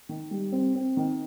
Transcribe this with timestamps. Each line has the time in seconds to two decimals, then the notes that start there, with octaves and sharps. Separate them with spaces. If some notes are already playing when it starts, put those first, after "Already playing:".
0.09 D#3
0.31 G3
0.52 C4
0.75 C4
0.97 D#3